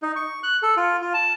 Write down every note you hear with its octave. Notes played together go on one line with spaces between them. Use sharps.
D#4
C#6
F#6
A4
F4
F4
A5